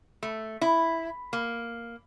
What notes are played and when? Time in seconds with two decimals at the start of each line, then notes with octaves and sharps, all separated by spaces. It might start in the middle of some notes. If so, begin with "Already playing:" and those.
0.23 A3
0.61 E4
1.33 A#3